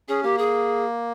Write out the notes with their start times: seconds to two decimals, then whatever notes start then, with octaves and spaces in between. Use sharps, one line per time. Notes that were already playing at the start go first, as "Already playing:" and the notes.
0.08 C#4 G#4
0.23 A#3 G4
0.38 G#4